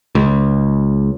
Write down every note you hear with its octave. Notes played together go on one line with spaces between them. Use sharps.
C#2